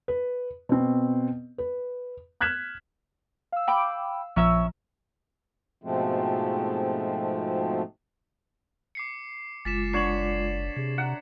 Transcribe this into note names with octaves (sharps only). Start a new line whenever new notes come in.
B4
B2 C4
B4
F6 F#6 G#6 B6 E7
F5 E6
G5 B5 D6
A#1 F3 C#4 E5 A#5 E6
G#2 B2 F3 G#3 A3 C4
D6 C7 C#7
F#1 G#3 F4 D6 A6 B6 E7
D3 C#5 C7 E7 F#7
C3 G#4
F#5 A#5